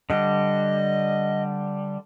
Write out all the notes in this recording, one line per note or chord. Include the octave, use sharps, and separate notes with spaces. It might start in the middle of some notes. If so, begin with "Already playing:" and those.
D3 G3 D#5